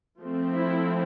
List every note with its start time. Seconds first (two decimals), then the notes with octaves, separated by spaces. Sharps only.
0.20 F3 A3 C4
0.53 E4